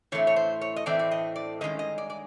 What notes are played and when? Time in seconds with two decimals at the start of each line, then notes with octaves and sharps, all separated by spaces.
0.12 A2 E3 A3 C4 C#5
0.27 C#5
0.36 C5
0.61 C#5
0.76 D#5
0.86 A2 E3 A3 C4 D5
0.99 D5
1.11 D#5
1.36 D5
1.61 G2 D#3 G#3 C#4 D#5
1.79 D#5
1.98 D5
2.10 D5